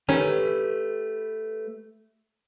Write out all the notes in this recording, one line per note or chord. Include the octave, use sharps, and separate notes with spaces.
D#3 A3 C#4 G4 B4